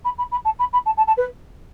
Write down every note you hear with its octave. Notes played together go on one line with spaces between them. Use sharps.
B5
B5
B5
A5
B5
B5
A5
A5
A5
B4